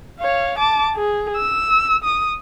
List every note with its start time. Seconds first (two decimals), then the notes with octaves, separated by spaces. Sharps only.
0.19 C#5 F5
0.58 A5 D6
0.95 G#4
1.37 E6
2.04 D#6